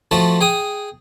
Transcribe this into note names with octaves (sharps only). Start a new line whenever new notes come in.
F3 A3 F4 F#4 A5
G#4 G5 D#6